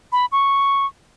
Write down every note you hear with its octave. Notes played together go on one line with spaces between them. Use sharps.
B5
C#6